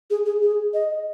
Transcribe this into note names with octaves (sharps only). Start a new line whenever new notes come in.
G#4
G#4
G#4
D#5